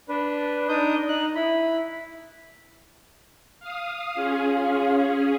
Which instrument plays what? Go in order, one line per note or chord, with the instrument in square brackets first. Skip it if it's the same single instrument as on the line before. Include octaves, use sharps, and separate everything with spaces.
[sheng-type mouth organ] D4 B4
D4 D#4 D#6 G6
D#4 F#6
E4 B5
[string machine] F5 D#6
[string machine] C#4 G#4 [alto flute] F4